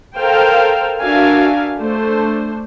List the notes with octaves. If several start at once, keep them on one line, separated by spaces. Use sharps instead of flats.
A4 A#4 C5 F5 G5
D4 F#4 A#4 E5 F5 G#5
A3 D4 C5